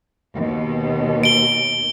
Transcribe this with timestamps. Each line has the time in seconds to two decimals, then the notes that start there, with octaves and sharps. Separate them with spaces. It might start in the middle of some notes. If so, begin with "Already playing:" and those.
0.35 D#2 B2
1.23 D7 G7